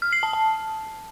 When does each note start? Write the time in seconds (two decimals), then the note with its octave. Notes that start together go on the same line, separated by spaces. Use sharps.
0.02 F6
0.12 C7
0.23 A5
0.33 A5